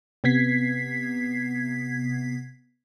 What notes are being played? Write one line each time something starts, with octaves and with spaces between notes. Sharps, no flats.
C3 B3 G#6 B6 C7